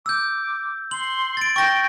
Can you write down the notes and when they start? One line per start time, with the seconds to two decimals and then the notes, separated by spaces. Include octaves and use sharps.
0.06 D6 E6 G6
0.91 C6 F#7
1.37 A6 D7
1.56 G5 C#6 A#6